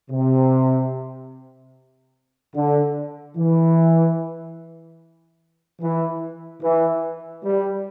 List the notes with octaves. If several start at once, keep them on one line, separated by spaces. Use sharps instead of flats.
C3
D3
E3
E3
E3
G3